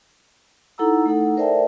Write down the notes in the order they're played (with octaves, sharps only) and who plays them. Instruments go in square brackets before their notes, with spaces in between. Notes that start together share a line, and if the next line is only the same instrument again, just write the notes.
[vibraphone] D#4 E4 A4 F#5 A#5 E6
A3 D#4 A4 F#5
A#4 C5 D5 E5 G5 A5